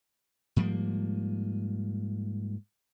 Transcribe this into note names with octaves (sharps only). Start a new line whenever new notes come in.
G#2 F3 G3 A#3